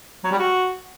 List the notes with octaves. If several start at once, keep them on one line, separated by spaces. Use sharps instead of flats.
F#3
G3
F#4